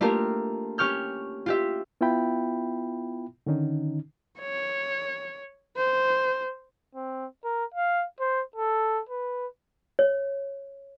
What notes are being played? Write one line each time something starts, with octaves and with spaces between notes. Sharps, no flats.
A3 A#3 D4 F4 G4 A#4
C#4 G4 C#6 F6 G6
F4 G4 E5
B3 E4 F4 E5 G5 B5
D3 D#3 C#4 D#4
C#5
C5
C4
A#4
F5
C5
A4
B4
C#5